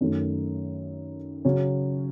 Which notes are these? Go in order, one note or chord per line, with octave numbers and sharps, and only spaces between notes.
F#2 D#3 A3
C#3 F#3 C#4